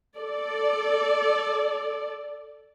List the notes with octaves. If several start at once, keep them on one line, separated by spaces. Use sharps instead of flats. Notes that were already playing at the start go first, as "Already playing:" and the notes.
A4 D5